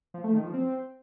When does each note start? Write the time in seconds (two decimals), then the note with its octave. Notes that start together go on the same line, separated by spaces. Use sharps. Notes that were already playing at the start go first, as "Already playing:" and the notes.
0.14 F3
0.24 A3
0.34 D#3
0.44 F3
0.54 C4